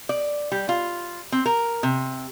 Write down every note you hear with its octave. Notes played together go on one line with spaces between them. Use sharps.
D5
G3
F4
C4
A#4
C3